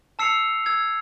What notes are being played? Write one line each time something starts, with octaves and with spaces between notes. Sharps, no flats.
A5 E6 C7 C#7 F7
E6 G#6